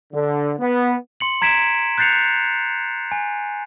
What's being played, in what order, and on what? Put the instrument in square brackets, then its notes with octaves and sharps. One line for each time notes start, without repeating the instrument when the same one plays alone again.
[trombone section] D3
B3
[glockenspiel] C6 C#7 F#7
A#5 G#6 B6 D7 E7
F#6 G6 A6 C7 C#7 F7
G#5